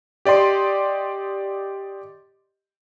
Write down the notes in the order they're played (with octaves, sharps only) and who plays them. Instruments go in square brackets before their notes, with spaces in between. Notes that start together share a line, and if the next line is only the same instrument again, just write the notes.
[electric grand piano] G4 D5 D#5 C6